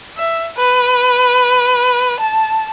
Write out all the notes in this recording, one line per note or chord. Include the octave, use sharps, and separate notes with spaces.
E5
B4
A5